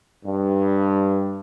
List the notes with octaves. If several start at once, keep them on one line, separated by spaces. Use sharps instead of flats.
G2